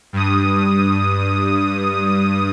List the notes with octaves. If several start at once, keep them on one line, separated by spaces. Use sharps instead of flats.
G2 D#6